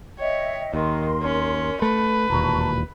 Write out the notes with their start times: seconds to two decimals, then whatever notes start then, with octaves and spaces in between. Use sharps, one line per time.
0.19 C#5 D#5 E5 G5
0.74 D#2 D#3 A#4 C6
1.23 C#4
1.82 A3 B4
2.30 E1 D#2 A#2 A5 A#5 C#6